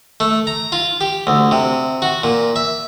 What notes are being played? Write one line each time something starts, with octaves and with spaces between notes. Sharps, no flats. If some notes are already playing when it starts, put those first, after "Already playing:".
A3
A#5
F4
G4
D2
C3
F#4
A#2
E5